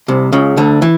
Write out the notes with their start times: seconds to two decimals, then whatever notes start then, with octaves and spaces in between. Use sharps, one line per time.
0.08 C2 C3
0.33 C#2 C#3
0.57 D2 D3
0.82 E3